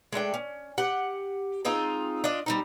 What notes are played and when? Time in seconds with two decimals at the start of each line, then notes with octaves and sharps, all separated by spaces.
0.12 G#3 A3 D4 G5
0.34 C#4
0.78 G4 F#5
1.65 G#3 C4 D#4 F4
2.24 D4 F4 D#5
2.46 G3 C4 D#4